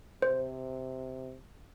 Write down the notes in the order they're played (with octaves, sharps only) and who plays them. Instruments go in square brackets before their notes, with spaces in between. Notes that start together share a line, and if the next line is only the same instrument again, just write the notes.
[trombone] C3 [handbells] C5